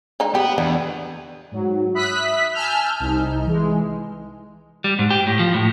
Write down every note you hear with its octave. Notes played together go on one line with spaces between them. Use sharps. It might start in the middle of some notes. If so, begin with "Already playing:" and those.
D3 G#3 D#4
B3 G4
E2 D3
G#2 F#3
E5 B5 D#6 F#6 B6
G#5 A5 E6 F6 G6
C2 D#4
E3 G#3
G3
G#2
G4
A2
F3
A2